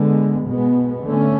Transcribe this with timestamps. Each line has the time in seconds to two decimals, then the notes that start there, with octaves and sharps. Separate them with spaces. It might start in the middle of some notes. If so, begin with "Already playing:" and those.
Already playing: D3 G#3 B3
0.47 B2 G#3 B3
1.05 D3 A3 C#4